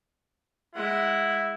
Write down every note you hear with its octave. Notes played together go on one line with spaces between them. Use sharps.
G#3 E4 F#5